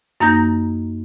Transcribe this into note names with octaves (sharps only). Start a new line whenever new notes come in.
F#2 A#3 D#4 A#5 G6 A#6